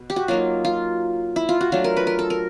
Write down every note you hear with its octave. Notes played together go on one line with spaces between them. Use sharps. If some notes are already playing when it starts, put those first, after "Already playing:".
Already playing: B2
G4
F#4
F#3 A#3 D#4 F4
F4
E4
F4
F#4
F#3 A3 D4 F4
A#4
B4
A#4
A4
A#4